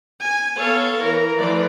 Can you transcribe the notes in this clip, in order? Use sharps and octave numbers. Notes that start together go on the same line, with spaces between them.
G#5
B3 A4 C#5 F5
E3 A#4
E3 F3 A3 D5